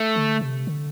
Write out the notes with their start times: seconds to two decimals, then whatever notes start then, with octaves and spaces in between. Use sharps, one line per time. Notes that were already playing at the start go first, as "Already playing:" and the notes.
Already playing: A3
0.16 D3
0.41 C3
0.67 D3